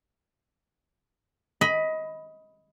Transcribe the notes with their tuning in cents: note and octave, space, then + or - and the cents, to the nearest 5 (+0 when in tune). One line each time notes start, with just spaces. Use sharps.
D#5 +20 B5 +0